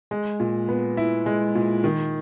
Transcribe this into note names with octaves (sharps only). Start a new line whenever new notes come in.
G#3
A#2
B3
E4
G#3
A#2
D#3